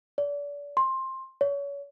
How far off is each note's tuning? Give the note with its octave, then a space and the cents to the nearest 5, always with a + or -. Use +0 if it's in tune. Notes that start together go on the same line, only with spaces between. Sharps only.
D5 -35
C6 +15
C#5 +30